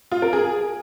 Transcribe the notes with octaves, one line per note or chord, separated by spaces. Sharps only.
F4
A#4
G#4